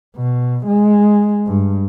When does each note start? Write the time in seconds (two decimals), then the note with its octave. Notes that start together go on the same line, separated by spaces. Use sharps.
0.16 B2
0.66 G#3
1.47 G2